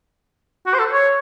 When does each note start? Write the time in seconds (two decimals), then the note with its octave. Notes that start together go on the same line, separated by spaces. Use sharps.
0.66 F#4
0.74 C5
0.79 A4
0.92 C#5